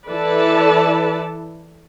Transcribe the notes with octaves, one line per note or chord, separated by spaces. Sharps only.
E3 E4 A4 B4 D5 A5